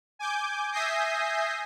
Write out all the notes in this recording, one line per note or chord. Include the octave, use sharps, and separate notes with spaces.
G#5 D6 G6
E5 G#5 D#6 G6 A#6 C7